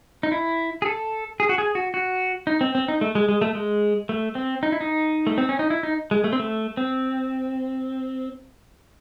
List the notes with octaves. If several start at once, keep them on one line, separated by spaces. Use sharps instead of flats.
D#4
E4
G#4
A4
G#4
F#4
G#4
F#4
F#4
D#4
C4
C4
D#4
A3
G#3
G#3
A3
G#3
A3
C4
D#4
E4
D#4
A3
C4
C#4
D#4
E4
D#4
G#3
A3
C4
A3
C4